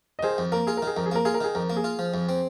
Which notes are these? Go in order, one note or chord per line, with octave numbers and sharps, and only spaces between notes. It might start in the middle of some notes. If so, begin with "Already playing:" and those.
D#5
D#3 G#4 C5
F2
A#3 A#4
F4 G#4
A#4
D#3 G#4
F2 A#4
G#4
A#3 A#4
F4 G#4
A#4
D#3 G#4
F2 A#4
A#3
G#4
F4
F3
F2
C4